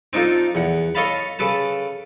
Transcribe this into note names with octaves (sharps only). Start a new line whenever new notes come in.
C4 D4 D#4 F4 A4
E2 F#5
A4 C#5 D#5 F5 A5 B5
C#3 A4 B4 A5